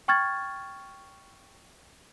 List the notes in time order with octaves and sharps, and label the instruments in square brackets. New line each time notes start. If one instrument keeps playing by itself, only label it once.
[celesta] G5 C#6 F6 G#6 A6